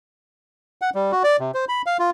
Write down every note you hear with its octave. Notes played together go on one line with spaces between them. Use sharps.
F#5
G3
F#4
D5
C3
C5
B5
F5
F4